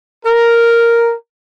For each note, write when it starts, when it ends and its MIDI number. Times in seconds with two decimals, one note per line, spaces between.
0.25 1.12 70